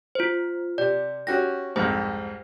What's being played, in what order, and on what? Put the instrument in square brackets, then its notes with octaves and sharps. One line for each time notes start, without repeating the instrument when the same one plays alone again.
[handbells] F4 C5
[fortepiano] C3 [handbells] D5
[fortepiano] C#4 F#4 G4 [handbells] A#6
[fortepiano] C2 F2 G#2 [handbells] C5